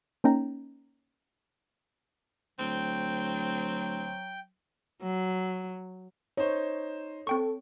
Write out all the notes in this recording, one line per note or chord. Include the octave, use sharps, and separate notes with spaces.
A#3 C#4 D#4 G5 A#5
D2 F#3 C4 G5
F#3
D#4 C5 C#5
C4 A4 G5 C#6